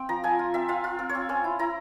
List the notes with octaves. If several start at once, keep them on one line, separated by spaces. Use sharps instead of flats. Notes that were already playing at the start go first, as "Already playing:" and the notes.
Already playing: C4 G5
F3 A#5
F3 G#5
F4
C4 E5
F4 F5
F4
C4
C#5
C4
C#4 C5
E4
E4 A#5